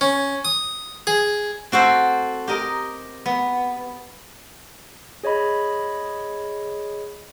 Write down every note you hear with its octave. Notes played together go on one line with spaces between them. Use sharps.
C#4
D#6
G#4
C4 F#4 A4 C5
G4 A#4 D#5
B3
G#4 C#5 D#5 B5